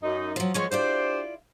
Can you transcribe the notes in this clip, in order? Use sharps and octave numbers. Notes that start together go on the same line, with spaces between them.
F#2 D#4
F3 F#3
F3 G#3 B3 C#5
D4 E4 F4 G4 C5 D5